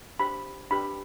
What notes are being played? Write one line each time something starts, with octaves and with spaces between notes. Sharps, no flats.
D4 G4 C5 B5
D4 G4 B4 B5